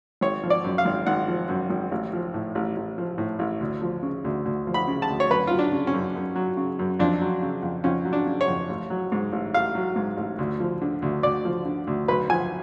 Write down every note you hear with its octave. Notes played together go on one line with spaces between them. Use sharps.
G#1 C#5
F3
D5
F#2
F5
G#1
G#1 F#5
F3
F#2
G#1
A1
F3
A2
A1
A1
F3
A2
A1
D2
F3
C#3
D2
D2
F3
B5
C#3
A5
D2
C#5
F#2 B4
F#3 F4
D4
C#3
C#4
F#2
F#2
F#3
C#3
F#2
F2 D4
F#3
C#3
F2
F2 C#4
F#3
D4
C#3
C#5
F2
A1
F#3
G#2
A1
A1 F5
F#3
G#2
A1
D2
F3
D3
D2
D2 D5
F3
D3
D2
B1 B4
F3 G#5